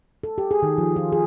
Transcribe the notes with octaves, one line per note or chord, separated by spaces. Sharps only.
A4
G4
G#4
D#3
F3
F4
G#4